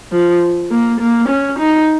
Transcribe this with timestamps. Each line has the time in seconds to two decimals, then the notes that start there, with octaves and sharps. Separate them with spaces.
0.12 F3
0.71 A#3
1.00 A#3
1.29 C#4
1.59 D#4